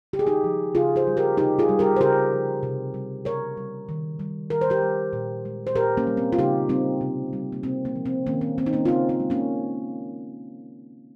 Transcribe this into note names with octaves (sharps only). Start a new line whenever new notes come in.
C#3 G4
G#4
D#4 G4
F3
C#3 F4 G#4
G#4 C5
G3
G4 A#4
C3 D#4 G4
F4 G#4
G3
G4 A#4
C5
C#3 G4 A#4
F3
C3
G3
C#3 A#4 C#5
G3
D#3
G3
D#3 A#4
C5
G4 A#4
G3
A#2
G#3
C5
A#2 G4 A#4
A#3 C#4
G3
C4
F4
C#3 D#4 G4
G3 C4 D#4
C3
G3
A#3
C3 C4
A#3
F3
C4
D#3 A#3 C#4
C4
A#3 C4
D#4
A#3 C#4
F4
C#3 C4 D#4
C4
G#3
A#3 C#4